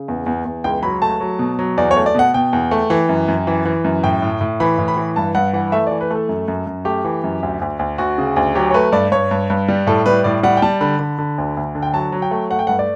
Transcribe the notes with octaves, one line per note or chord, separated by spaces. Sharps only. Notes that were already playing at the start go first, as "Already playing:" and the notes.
Already playing: C#3
E2
E2
E2
C#2 G5
F#3 B5
A3 A5
F#3
B2
F#3
E2 D5
C#5
A3
D5
B2 F#5
B2 G5
E2
A3
E3
F#2
F#2
E3
E3
F#2
A2 G5
A2
A2
E3 B5
A2
B5
E3
G2 A5
G2 F#5
E3 F#5
A3 E5
E3 D5
B4
A3 A4
F#2
F#2
F#2
A3 G4
E3
F#2
D2
D2
D2
D2 F#4
C#3
D2
F#3 G4
C#5
A3 B4
G2 D5
G2 C#5
G2
G2
G3
A2 A4
G3 B4
A2 D5
G3 F#5
G5
G3 A5
D3 B5
D3
D3
D2
D2
D3
G5
F#3 A5
F#3
G5
A3
A3 F#5
G5
G2 F#5
D5